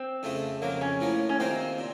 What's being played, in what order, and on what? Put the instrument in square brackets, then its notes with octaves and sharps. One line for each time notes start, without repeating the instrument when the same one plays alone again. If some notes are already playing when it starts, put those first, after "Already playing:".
Already playing: [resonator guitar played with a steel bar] C4
[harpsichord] F2 C#3 F3 A3
[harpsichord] F2 C#3 F#3 [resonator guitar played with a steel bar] A#3
[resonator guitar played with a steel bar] C#4
[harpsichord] A2 F3 A#3
[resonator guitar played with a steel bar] C#4
[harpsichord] C3 D#3 A#3 F4 [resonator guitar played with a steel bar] C4
[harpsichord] A#2